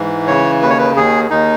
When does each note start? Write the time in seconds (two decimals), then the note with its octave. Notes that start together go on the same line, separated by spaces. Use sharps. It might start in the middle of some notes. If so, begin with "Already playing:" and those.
Already playing: G#2 E3
0.27 C#3 C#5
0.62 D#2 B4
0.70 C#5
0.79 B4
0.96 D#2 G#4
1.30 D#2 D#4